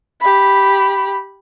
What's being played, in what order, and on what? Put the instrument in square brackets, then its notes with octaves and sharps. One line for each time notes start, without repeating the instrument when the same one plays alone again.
[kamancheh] G4 B5